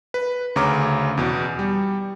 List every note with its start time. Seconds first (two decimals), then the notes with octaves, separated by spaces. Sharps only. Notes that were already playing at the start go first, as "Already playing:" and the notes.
0.14 B4
0.56 D2 C#3 C#5 A#5 D6
1.17 E2 B2
1.59 G3